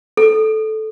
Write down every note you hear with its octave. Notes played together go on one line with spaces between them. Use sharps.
A4